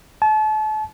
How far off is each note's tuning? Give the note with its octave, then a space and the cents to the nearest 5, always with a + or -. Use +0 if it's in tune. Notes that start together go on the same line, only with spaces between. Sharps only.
A5 -35